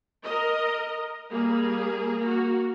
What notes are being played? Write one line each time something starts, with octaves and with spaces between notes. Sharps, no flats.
A#4 D#5
G3 A#3 G#4
A#3 F#4